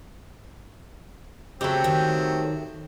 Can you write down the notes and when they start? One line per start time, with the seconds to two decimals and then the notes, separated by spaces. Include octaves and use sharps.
1.61 C#3 F#3 A3 C4 G4
1.84 D#3